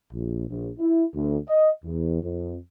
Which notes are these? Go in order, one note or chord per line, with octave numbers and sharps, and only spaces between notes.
A#1
A#1
E4
D2
D#5
E2
F2